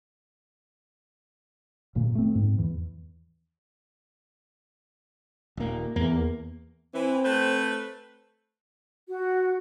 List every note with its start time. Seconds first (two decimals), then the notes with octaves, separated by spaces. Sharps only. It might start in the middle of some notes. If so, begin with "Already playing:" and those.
1.95 F#1 A#2 D#3 A#3
2.15 A3 C4
2.35 G#2
2.58 E2 E3
5.57 D#1 A#3
5.96 E2 A#3
6.94 E3 C4
7.24 A3 B4 C5
9.07 F#4